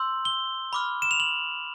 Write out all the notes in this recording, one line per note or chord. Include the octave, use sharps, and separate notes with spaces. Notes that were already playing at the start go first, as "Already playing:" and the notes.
Already playing: C6 E6 G6 F#7
G7
B5 D6 F6
E7
F7
F#7